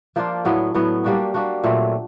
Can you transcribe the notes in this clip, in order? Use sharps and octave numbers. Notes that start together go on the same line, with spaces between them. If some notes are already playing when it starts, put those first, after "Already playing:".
F3 A#3 D4 F4
A2 F#3 B3
A2 F#3 B3
G3 A#3 D4 F#4
G3 A#3 D4 F#4
A#2 F#3 A3 C4